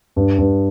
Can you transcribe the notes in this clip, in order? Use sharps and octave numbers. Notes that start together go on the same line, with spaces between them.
G2
G2